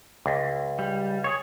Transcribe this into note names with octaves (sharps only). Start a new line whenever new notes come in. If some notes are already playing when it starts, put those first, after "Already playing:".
C#2
G3
G#4 C#5